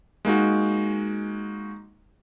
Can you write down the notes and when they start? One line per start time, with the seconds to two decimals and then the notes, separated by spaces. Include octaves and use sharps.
0.25 G#3 A#3 D#4 F#4